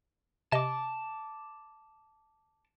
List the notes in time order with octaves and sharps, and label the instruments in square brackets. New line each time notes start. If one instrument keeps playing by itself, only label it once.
[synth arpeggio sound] C3 D#5 [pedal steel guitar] A5 D6